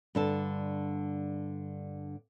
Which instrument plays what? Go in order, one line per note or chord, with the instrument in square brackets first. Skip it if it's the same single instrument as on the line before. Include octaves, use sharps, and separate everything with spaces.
[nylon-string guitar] G2 D3 A5